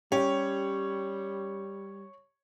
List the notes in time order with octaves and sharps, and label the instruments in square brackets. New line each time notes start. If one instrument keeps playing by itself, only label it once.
[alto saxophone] G3 [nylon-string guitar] C#4 G4 [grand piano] C#5